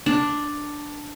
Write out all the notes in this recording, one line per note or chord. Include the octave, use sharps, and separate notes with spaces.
D4